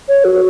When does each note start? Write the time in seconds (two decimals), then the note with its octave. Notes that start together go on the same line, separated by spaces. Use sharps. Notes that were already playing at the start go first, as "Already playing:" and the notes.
0.08 C#5
0.25 F#4